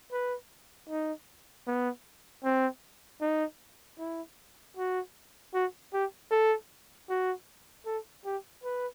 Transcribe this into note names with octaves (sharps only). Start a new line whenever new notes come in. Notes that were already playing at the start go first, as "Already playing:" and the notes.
B4
D#4
B3
C4
D#4
E4
F#4
F#4
G4
A4
F#4
A4
G4
B4